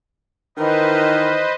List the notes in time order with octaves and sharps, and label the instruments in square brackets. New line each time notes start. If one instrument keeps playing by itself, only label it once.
[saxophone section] D#3 E3 [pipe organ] B4 C5 D#5